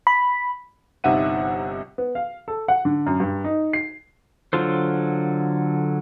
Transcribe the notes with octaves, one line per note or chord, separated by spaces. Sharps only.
B5
G1 C3 D#4 E5 F#5 D#7
B3
F5
A4
F#5
D3
F#2
G2
D#4
C7
D3 F#3 F4 A4 C5